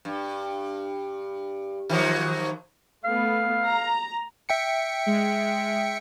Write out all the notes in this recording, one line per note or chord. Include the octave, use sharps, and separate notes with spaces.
G2
D#3 F3 F#3
A3 B3 F5
A#5
E5 G5 C#7
G#3